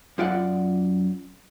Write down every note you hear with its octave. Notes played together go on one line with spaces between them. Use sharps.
F#2 F4 D5 F#5